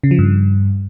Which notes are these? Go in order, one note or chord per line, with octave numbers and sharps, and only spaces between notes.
C#3
F3
G2